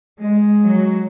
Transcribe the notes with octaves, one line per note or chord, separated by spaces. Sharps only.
G#3
F#3